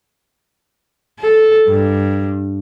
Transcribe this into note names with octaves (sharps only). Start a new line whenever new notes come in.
A4
G2